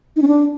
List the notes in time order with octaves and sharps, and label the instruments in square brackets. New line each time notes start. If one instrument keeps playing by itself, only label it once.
[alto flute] D#4
C#4
D4